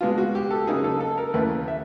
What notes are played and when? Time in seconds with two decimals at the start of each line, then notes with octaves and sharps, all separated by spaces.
0.01 B2 G#3 B3 D4 F4
0.18 F#4
0.35 G4
0.51 A4
0.67 C#3 F#3 A#3 D#4 G#4
0.84 A4
1.01 A4
1.18 A#4
1.34 D#2 C#3 E3 A3 B4
1.68 E5